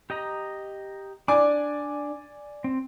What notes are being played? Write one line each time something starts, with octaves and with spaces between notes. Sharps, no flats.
G4 D#5 A#5
D4 D5 G#5 D6
C4